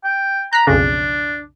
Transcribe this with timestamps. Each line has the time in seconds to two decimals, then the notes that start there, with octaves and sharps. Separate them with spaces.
0.04 G5
0.53 A#5 F#6 B6
0.67 B1 F2 C#3 D4